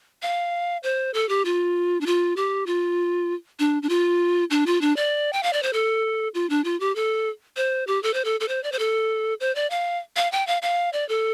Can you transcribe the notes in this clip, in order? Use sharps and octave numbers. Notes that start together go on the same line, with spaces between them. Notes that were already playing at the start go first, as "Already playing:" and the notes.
F5
C5
A4
G4
F4
D4
F4
G4
F4
D4
D4
F4
D4
F4
D4
D5
G5
F5
D5
C5
A4
F4
D4
F4
G4
A4
C5
G4
A4
C5
A4
A4
C5
D5
C5
A4
C5
D5
F5
F5
G5
F5
F5
D5
A4